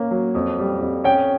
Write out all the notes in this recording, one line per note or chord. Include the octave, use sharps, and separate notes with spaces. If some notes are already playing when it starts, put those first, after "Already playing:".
Already playing: A#3 C#4
F#3
F2
G3
F2
C#4 G5